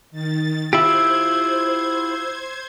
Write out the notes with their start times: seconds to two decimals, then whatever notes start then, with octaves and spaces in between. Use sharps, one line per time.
0.11 D#3 A6
0.73 E4 F4 G4 C5 E6 G#6